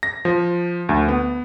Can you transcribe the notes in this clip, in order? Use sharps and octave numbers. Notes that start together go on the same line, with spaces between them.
A#6
F3
D2
B3